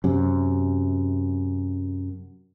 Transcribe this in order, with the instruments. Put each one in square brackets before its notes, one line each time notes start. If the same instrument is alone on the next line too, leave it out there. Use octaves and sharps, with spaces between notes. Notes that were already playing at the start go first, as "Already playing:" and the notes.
[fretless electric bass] F#2 C3